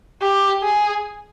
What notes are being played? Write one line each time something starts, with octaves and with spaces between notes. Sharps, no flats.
G4
G#4